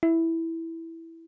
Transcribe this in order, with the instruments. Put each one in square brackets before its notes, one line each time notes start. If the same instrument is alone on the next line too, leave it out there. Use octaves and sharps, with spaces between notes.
[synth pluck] E4